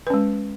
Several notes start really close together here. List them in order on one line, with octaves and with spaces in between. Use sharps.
B4 C#4 G#3